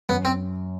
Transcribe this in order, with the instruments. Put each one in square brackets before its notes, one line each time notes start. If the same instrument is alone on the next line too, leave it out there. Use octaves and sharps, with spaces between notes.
[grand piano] F#2 [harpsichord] B3
[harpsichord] C4